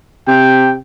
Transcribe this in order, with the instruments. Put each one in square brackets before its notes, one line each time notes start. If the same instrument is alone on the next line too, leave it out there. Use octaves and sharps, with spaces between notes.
[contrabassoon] C3 [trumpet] G5